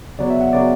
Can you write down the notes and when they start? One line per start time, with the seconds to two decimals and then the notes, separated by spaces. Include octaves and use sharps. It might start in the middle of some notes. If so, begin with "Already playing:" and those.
0.18 C#3 F#3 B3 D5
0.30 E5
0.41 F#5
0.53 C#3 F#3 B3 D5